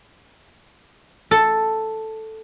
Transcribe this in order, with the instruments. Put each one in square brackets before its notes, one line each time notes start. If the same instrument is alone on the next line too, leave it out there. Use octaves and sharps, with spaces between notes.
[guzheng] A4